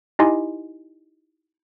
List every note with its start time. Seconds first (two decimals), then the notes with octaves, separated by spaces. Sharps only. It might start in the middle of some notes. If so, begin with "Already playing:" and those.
0.19 D#4 E4 G4 D#5 G#5 C6